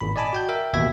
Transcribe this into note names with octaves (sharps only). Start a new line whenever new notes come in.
G#1 A#2 B5
D5 D#5 G#5 A5 B5 D6
F#4 G5 G6
A#4 E5 G5
A1 D#2 B2 E5 G#6